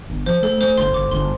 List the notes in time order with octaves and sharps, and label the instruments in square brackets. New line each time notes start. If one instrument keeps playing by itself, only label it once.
[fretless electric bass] G1
[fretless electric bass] F3 [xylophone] C5
[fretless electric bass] A3 [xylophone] A4
[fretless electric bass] A3 [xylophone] C5
[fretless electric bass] G1 [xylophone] C6
[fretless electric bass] G1 [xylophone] D6
[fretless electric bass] G1 [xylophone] C6